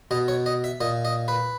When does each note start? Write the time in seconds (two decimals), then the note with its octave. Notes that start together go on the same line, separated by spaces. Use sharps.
0.11 B2 D#5
0.28 C#5
0.46 D#5
0.64 E5
0.81 A#2 D#5
1.05 D#5
1.28 B4